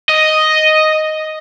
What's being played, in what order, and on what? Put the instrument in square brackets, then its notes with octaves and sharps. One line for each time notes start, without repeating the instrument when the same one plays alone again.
[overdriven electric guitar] D#5